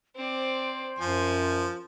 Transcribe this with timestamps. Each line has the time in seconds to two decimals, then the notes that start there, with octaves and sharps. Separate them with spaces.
0.16 C4 C5 D5
0.99 F#2 F3 G#5